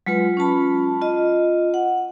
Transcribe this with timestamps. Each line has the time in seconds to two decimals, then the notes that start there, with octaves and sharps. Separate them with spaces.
0.07 F#3 G#3 F4 B4
0.37 C#4 F4 A5 B5
1.02 F4 D#5
1.74 F#5